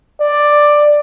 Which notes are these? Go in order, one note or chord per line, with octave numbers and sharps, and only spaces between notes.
D5